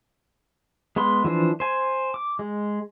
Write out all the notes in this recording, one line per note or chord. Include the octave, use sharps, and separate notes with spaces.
G#3 B3 B5 C6
E3 F3 D4 C5
C5 G#5
D6
G#3